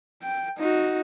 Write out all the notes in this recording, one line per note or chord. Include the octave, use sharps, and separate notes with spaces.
G5
D#4 F#4